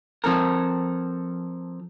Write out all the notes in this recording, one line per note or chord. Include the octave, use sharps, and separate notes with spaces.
F3 C4 A4 A#4